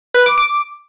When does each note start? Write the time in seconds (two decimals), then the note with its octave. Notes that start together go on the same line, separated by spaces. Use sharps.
0.14 B4
0.26 D6
0.38 D6